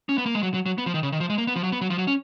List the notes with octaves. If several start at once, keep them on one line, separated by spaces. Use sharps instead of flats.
C#4
B3
A#3
G#3
F#3
F#3
F#3
B3
F3
D#3
C#3
D#3
F3
G#3
A#3
B3
F3
F#3
B3
F#3
F3
F#3
C#4